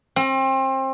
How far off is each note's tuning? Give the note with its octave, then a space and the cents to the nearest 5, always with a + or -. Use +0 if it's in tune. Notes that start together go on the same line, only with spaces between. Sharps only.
C4 +30